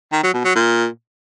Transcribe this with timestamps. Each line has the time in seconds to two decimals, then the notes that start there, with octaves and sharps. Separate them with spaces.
0.12 D#3
0.23 F#3
0.34 B2
0.44 F#3
0.55 A#2